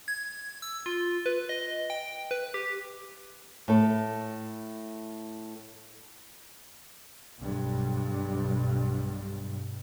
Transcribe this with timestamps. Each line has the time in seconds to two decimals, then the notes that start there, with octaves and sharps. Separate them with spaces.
0.08 G#6
0.62 E6
0.86 F4
1.26 B4
1.49 D#5
1.90 G5
2.31 B4
2.54 G4
3.68 A2 A4
7.41 B1 G2